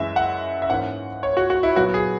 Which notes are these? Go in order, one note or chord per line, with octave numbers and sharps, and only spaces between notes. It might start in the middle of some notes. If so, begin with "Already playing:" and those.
Already playing: F#2 E3 G#3 E5
F#5
E5
G#2 E3 A#3 C#4 F#5
C#5
F#4
F#4
E4
A#2 F#3 B3 F#4
G#4